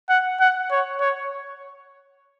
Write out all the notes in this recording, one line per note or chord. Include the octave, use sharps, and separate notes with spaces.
F#5
F#5
C#5
C#5